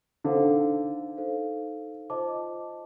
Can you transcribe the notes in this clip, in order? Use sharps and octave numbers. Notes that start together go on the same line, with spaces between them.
D3 D#4 A4 C5 F5
D#4 A4 C5 F5
F4 C5 D#5 A5 D6